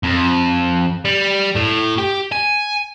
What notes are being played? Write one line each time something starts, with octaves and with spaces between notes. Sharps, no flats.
F2
G3
A2
G4
G#5